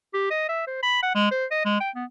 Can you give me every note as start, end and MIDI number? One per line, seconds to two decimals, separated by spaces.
0.14 0.26 67
0.31 0.44 75
0.49 0.64 76
0.67 0.82 72
0.83 0.99 83
1.03 1.11 78
1.15 1.31 56
1.31 1.45 72
1.51 1.64 75
1.65 1.80 56
1.80 1.90 79
1.95 2.04 59